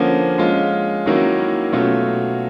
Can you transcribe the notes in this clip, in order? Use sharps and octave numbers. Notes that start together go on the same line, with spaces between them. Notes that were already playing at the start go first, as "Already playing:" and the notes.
Already playing: D3 F3 A#3 C#4
G#3 C#4 F4
D#3 F#3 A#3 C#4 E4
B2 F#3 A3 C#4 F4